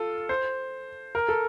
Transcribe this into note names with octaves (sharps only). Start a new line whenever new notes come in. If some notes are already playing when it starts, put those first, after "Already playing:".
Already playing: F4 A4
C5
A#4
A4